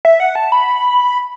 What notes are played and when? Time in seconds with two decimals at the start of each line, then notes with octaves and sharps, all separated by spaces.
0.05 E5
0.20 F#5
0.35 A5
0.52 B5